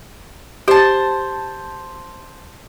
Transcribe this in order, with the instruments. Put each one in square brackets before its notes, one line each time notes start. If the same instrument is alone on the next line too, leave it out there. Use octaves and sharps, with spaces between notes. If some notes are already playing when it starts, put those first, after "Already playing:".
[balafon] G4 [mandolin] C5 A5